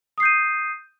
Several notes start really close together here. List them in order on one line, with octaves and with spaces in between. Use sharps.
D#6 C7 G6 D#7